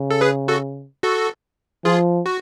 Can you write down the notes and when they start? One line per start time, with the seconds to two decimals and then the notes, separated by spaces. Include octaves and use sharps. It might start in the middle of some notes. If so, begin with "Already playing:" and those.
Already playing: C#3
0.11 A4
0.21 G#4 B4
0.48 F#4 A4
1.03 F#4 A4
1.85 F3 F4 G#4
2.26 F#4